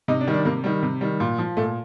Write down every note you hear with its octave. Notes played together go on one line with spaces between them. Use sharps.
C3 D#4
D4
D#3 G3
D4
C3 A#3
D#3 G3
C3
D#3 G3
A#2
F3
A#2 A3